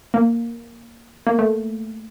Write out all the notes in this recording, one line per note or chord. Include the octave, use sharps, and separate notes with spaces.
A#3
A#3
A3